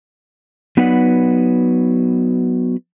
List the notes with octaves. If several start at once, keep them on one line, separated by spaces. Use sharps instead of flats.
F#3 B3 D#4 B4 D5 F#5